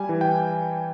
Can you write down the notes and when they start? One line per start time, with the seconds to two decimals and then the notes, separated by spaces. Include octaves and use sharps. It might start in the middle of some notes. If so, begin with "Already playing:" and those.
Already playing: G3 G#5
0.09 E3
0.21 G5